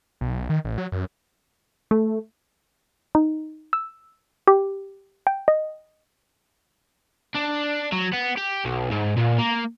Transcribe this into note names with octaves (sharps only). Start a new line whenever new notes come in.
B1
D#3
A1
F#3
F#2
A3
D#4
E6
G4
G5
D#5
D4
F#3
B3
G4
B1
G#2
A#2
A#3